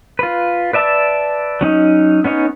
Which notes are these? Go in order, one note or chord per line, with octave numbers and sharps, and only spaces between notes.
F4 B4
B4 D5 E5 A5
F#3 C#4 D#4
B3 C#4 D#4 C#5